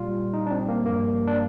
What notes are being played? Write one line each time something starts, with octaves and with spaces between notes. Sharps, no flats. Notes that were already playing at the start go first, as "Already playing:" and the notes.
Already playing: A#2 G3 F4
D#4
D4
C4
A#3
G2 F3 A#3
D4